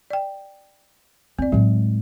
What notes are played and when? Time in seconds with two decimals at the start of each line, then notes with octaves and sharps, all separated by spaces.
0.10 D5 G5
1.39 E2 C4 D5
1.52 A2 F#3 G#3